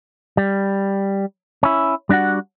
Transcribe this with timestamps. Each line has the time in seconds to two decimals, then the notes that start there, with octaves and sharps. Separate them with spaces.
0.37 G3
1.63 C#4 E4
2.09 G3 D4 D#4 F#4 F#5